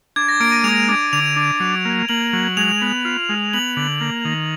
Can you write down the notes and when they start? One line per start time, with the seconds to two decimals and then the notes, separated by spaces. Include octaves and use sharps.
0.16 D4 G#6
0.29 A#6
0.40 A#3 D7
0.52 D#7
0.64 G#3 F7
0.88 D4
1.13 D3 F7
1.36 D4
1.60 F#3
1.85 A#3
2.09 A#3 F#7
2.33 F#3
2.57 G#3 F7
2.82 B3
3.05 F4
3.29 G#3
3.53 B3 F#7
3.77 D3
4.01 A#3
4.25 D#3